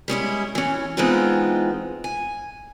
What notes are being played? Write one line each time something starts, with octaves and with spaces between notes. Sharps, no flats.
G3 G#3 C#4 E4
E3 C#4
E3 G#3 B3 C4 D#4 F4
G#5